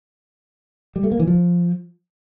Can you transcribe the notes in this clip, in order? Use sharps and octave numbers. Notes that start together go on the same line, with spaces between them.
G3
A3
A#3
E3
F3